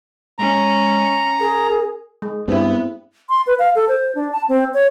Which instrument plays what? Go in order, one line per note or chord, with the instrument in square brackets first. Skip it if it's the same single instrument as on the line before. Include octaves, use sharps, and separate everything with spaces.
[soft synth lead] G#3 [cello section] C#4 [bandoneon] A#5
[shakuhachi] G#4 [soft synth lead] A#4
[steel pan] G#3
[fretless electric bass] G2 [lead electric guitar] B3 [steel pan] C4 E4
[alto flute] C6
B4
F5
A4
C5
D4
A5
C4
C#5